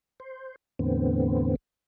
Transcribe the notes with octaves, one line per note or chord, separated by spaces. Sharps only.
C5
E2 A2 D3 B3 C4